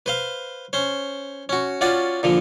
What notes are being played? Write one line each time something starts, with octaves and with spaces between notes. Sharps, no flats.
B4 C5 F5
C#4 C5
C#4 F#4
C#4 F4 F#4 D5 F#5
A#2 D3 F3